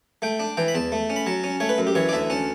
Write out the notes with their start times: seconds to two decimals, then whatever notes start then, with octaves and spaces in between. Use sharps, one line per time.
0.22 A3 G5
0.40 D4
0.57 E3 G5
0.68 B5
0.75 E2 A5
0.92 A3
1.10 C#4
1.16 B5
1.26 F#3 A5
1.44 C#4
1.60 A3 C#5
1.69 B4
1.78 F#2
1.87 G4
1.95 E3 C#5
2.09 D5
2.13 D2 E5
2.30 C#4 A5